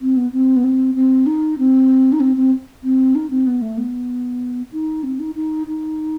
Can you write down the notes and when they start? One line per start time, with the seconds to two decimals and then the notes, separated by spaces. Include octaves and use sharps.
0.01 C4
0.17 B3
0.33 C4
0.56 B3
0.64 C4
0.95 C4
1.26 D#4
1.58 C4
2.12 D#4
2.20 C4
2.37 C4
2.84 C4
3.15 D#4
3.30 C4
3.47 B3
3.62 A3
3.77 B3
4.72 D#4
5.03 C4
5.19 D#4
5.35 D#4
5.67 D#4